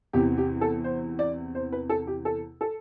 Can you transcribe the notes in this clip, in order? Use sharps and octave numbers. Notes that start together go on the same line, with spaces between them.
E2 C3 E3 G4
G4
A4
C5
D5
C5
B4
A4
G4
A4
A4